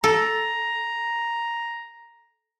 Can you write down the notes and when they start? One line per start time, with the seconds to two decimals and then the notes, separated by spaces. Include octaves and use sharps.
0.04 A4 A#5